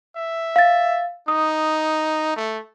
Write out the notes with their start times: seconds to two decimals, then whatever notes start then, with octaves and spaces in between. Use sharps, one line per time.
0.16 E5
0.56 F5 A6
1.28 D#4 D#6
2.36 A3